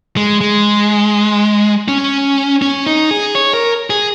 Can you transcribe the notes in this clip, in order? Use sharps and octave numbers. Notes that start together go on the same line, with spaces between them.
G#3
G#3
C#4
C#4
D#4
G#4
C#5
A#4
G#4